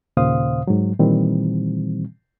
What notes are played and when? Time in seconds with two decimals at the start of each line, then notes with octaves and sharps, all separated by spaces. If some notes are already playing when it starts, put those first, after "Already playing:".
0.17 D#2 A#2 C#3 C5 F5 D#6
0.67 G#2 F#3
0.99 A#2 D#3 E3 G3 C4